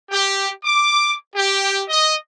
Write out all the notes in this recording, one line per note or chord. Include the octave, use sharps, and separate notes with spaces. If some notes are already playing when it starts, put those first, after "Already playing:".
G4
D6
G4
D#5